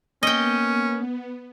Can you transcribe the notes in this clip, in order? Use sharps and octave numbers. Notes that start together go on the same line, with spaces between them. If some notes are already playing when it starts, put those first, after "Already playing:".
A#3 B3 C#4 D#5 G5